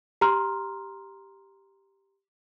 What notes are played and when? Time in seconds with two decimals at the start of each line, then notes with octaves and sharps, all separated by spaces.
0.21 G4 A#5 C6 F6